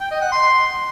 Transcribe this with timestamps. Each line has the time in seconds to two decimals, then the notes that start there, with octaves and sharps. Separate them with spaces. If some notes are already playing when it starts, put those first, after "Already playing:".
0.01 G5
0.11 D#5
0.21 F#5
0.32 C6